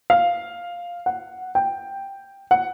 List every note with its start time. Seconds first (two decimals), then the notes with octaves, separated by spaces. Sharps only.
0.10 F5
1.06 F#5
1.55 G5
2.51 F#5